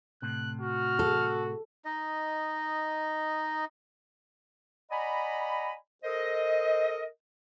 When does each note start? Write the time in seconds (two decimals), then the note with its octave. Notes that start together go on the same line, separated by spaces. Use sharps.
0.22 A2 C3 F#6
0.61 F#4 F6
0.99 A4
1.85 D#4 D#5
4.90 D5 D#5 F#5 G#5 A#5 B5
6.04 A4 A#4 C5 D#5